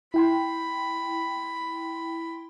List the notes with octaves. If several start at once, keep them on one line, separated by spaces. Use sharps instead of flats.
E4 G5 B5 C6